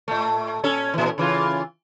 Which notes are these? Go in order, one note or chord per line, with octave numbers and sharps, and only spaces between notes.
A2 A3
A#2 C#4 A4
A#2 E3
C#3 E3 F4